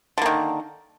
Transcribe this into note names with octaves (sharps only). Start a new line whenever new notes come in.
D3 D#3 A#3